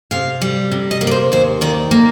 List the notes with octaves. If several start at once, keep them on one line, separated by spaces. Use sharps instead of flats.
C3 F5
G3
C3
D#5
A#3
D5
C5
D#2 C5
D#3 D5
A#3